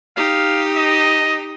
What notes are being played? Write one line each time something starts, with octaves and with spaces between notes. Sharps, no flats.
D#4 G4 F5
D#5